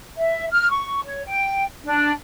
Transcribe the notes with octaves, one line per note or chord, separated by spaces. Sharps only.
E5
F6
C#6
C#5
G5
D4